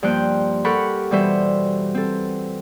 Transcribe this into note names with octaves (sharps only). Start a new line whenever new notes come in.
G2 F3 A#3 C5 G5 F#6
G4 A4 A#4 F#5 B5 C#6
B2 E3 G3 F#4 C5 E5
C4 A4